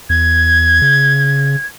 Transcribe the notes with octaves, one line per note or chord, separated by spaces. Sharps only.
E2 G#6
C#3